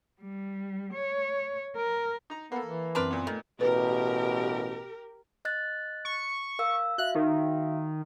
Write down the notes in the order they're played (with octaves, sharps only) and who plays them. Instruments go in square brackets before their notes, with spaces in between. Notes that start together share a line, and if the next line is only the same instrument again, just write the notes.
[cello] G3
C#5
A#4
[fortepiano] D#4 A#5
[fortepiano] A#3 A4 [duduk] B3
[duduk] E3
[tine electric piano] F#2 C4 C6 [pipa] D4 A#4 B4
[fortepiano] A#2 B3
[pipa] D#3 [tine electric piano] A3 A4
[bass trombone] A1 [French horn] B2 [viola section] G4 A#4 [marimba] B4
[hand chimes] D#5 F#6 A6
[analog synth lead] C#6
[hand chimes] A#4 F5 E6
[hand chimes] F#4 E5 F5 [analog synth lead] F#6
[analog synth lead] D#3